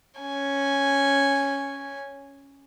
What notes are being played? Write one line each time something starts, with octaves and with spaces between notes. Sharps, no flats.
C#4 G#5